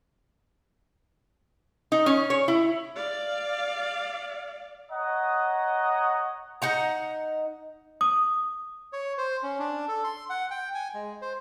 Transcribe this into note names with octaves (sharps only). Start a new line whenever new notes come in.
D#4
C#4
C#5
E4
D5 F5
C#5 D#5 F#5 A#5 D#6
D#4 F#5 A#5
D#6
C#5
C5
C#4
D4
A4
C6
F#5
G5
G#5
G#3
C5